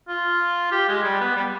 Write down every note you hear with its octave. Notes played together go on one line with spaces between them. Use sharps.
F4
G4
G#3
G3
B3
G3